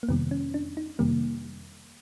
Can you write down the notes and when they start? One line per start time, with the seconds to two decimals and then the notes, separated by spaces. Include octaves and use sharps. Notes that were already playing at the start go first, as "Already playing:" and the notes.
0.03 A#3
0.09 F2 C3 D#3 G3 B3
0.31 C#4
0.54 D4
0.77 D#4
0.99 F2 C3 D#3 G3 A#3